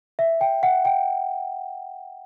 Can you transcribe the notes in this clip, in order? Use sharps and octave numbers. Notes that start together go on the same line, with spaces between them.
E5
G5
F#5
G5